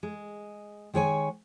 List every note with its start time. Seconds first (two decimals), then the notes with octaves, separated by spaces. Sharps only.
0.03 G#3
0.94 D#3 G#3 C#5 G#5